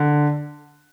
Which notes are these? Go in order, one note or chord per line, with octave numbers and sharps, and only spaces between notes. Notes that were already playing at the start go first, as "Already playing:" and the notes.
Already playing: D3